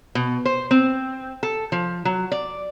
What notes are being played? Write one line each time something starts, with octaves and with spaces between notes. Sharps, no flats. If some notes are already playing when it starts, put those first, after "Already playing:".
B2
C5
C4
A4
F3
F#3
D5